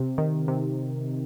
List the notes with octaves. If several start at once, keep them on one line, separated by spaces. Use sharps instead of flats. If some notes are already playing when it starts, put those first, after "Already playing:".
Already playing: C3
D#3
C3